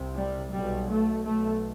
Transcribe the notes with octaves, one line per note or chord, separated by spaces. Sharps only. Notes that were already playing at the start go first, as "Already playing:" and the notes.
Already playing: C2 C3
G3
B1 B2 G3
A3
B1 B2 A3